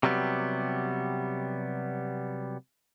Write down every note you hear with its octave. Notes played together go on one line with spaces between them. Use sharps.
C3 F#3 G3 B3